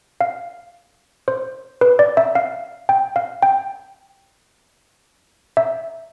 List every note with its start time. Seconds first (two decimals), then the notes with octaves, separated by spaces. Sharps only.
0.21 F5
1.28 C5
1.81 B4
1.99 D5
2.17 E5
2.35 F5
2.89 G5
3.16 F5
3.43 G5
5.57 E5